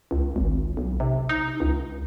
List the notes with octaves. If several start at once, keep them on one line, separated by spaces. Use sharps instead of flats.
C#2
G#1
B1
C3
D#4
C#2